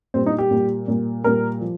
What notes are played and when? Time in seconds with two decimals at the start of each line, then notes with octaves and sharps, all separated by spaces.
0.14 A#2 G3 C4
0.26 D#4
0.38 G4
0.51 A#2
0.56 G3
0.88 A#2 G3
1.24 A#2 G3 A#4
1.61 F3